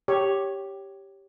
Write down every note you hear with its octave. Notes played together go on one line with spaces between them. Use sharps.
G4 C#5